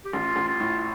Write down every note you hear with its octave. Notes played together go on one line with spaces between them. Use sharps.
G4
A1 F4
A1
F4
A2